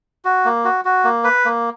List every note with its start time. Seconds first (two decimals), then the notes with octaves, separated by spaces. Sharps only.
0.25 F#4
0.45 A#3
0.65 F#4
0.85 F#4
1.04 A#3
1.24 B4
1.45 A#3